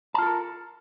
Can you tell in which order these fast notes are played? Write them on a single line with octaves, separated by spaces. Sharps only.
A5 F4 A4 A#4